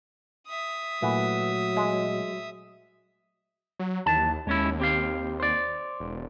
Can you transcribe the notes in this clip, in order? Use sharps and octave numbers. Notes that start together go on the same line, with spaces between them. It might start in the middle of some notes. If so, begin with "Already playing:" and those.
E5 D#6
A#2 E3 F#3 A3 F#5
G#3
F#3
D#2 E3 A5
D#2 G#3 C#4 E4
C4 G4 F5
C5 D5
E1